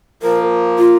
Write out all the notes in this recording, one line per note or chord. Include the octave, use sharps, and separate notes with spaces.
F3 A#3 A#4
F4